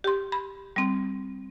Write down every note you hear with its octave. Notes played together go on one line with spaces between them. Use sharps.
G4 C6
B5
G3 C4